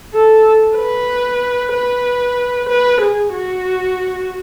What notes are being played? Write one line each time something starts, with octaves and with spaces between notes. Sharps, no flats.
A4
B4
B4
B4
G#4
F#4